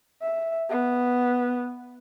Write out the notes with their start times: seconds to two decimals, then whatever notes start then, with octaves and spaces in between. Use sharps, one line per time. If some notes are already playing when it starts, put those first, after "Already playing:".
0.22 E5
0.70 B3